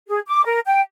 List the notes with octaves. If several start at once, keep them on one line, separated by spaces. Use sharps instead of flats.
G#4
D6
A#4
G5